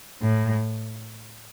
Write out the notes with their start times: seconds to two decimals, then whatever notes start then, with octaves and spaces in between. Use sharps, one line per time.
0.22 A2